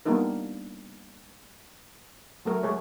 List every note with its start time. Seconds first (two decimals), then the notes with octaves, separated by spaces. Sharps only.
0.05 G3 A#3 B3 D4 D#4 A#4
2.45 F#3 A3 A#4
2.63 G#3 G#4 C#5